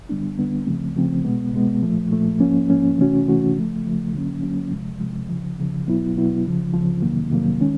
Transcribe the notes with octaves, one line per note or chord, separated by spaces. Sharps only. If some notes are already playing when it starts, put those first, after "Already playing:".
F2 D3 G3 B3 D4
F2 D3 G3 B3 D4
C#3 F3 A3 C4
C#3 F3 A3 C4
B2 G#3 B3
B2 G#3 B3
A#2 F3 A3
A#2 F3 A3
G#2 F3 A#3 C#4
G#2 F3 A#3 C#4
C3 E3 A3 C#4 F#4
C3 E3 A3 C#4 F#4
C#3 F3 A3
C#3 F3 A3
D3 F#3 A#3 C#4
D3 F#3 A#3 C#4
C3 F3 G#3
C3 F3 G#3
D#2 C#3 F3
D#2 C#3 F3
B2 F#3 B3 E4
B2 F#3 B3 E4
C#2 C#3 F3
C#2 C#3 F3
F2 C3 D#3 F#3 A#3
F2 C3 D#3 F#3 A#3
D#3 G#3 C#4